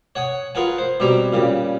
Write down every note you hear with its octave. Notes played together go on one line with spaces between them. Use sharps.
C#5 F#5 G#5 D#6
F4 G#4 A#4 B4 F#5 G#5
C5
B2 G3 C4 G4 G#5 A#5
A#2 C#3 G3